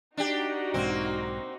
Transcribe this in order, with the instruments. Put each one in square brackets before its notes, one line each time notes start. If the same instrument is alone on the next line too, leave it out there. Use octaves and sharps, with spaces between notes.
[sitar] D4 G4 [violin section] D#4 F#4
[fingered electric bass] B1 G#2 [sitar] A#3 C4